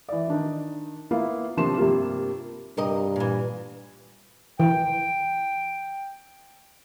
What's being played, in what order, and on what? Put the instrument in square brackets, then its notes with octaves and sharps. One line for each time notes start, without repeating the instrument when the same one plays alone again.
[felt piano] E3 D5
D#3 D4 D#4
A#3 B3 E4 F4 F5
C3 F3 A#3 D4 C6 E7
G2 C3 G3 A#3 F4
[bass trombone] G2 [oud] C3 A#4 D#5
[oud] A#2 E3
[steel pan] E3 [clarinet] G5